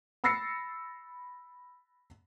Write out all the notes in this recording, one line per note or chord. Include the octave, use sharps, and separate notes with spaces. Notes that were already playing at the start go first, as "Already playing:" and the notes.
B5 E6 A6 A#6 C7 C#7